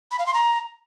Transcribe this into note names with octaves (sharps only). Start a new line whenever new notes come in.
B5
F5
C6
A#5